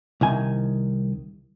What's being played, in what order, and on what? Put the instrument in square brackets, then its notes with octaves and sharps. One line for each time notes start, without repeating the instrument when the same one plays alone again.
[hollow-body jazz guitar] C2 D#3 G#5